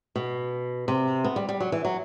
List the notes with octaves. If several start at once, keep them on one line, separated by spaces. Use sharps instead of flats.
B2
C3
B3
G3
G3
F#3
E3
F#3